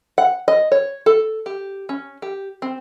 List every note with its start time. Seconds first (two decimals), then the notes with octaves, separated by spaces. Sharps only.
0.18 F#5
0.48 D#5
0.72 C#5
1.06 A4
1.46 G4
1.89 C#4
2.22 G4
2.62 C4